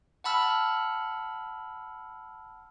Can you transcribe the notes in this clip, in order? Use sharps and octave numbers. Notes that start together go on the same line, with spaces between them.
F#5 A5 B5 E6 F6